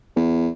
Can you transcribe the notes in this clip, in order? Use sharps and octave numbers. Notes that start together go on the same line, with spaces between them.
E2